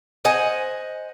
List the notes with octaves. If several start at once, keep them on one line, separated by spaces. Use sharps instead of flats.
C5 D#5 F#5 G#5